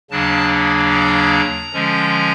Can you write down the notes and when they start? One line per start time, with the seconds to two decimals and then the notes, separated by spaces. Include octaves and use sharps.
0.11 D#2 C#3 F#3 A#3 D4 A5
0.92 A#5
1.73 D3 F3 G#3 C#4